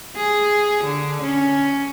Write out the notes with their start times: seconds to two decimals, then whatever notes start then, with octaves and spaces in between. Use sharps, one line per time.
0.16 G#4
0.84 D3
1.22 C#4